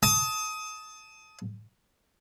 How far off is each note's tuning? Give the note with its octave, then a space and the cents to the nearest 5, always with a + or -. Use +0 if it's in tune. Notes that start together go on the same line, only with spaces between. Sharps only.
A5 -5 D#6 +20